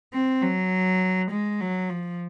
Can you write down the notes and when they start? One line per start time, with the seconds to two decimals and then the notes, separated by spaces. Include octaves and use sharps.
0.13 C4
0.42 F#3
1.31 G#3
1.60 F#3
1.89 F3